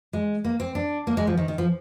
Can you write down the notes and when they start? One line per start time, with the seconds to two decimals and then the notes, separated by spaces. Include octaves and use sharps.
0.13 G#3
0.44 A#3
0.60 C4
0.75 D4
1.07 A#3
1.17 G#3
1.27 F3
1.37 D#3
1.48 D#3
1.58 F3